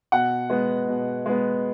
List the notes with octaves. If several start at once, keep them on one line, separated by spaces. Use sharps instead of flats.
B2 F#5
G#3 B3
B2
G#3 B3